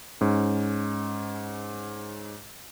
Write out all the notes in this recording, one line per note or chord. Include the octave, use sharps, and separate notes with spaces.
G#2 C#4